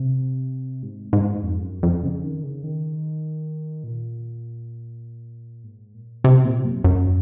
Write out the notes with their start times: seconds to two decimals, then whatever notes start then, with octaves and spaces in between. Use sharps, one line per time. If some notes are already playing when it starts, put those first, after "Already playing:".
Already playing: C3
0.83 G#2
1.13 G#2
1.43 F2
1.64 F#2
1.83 F2
2.03 C#3
2.23 D#3
2.43 C#3
2.64 D#3
3.84 A#2
5.64 G#2
5.94 A#2
6.24 C3
6.45 A#2
6.65 F#2
6.84 F#2